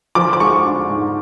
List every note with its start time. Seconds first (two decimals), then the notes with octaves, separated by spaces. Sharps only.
0.15 F3 D6
0.33 D6
0.40 G#3 C#6
0.65 D4
0.90 G#2